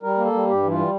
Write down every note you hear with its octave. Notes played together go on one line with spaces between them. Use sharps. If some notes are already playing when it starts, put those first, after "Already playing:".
G3 A#4
A#3
A4
G3
G2 G4
E3
F4
G3